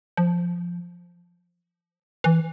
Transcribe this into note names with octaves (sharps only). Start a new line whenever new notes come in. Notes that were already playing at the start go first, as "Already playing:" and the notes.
F3
E3